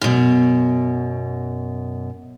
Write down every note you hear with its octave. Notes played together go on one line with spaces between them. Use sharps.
F#2 B2